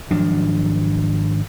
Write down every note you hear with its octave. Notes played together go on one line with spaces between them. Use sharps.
G#1 F3 F#3 D4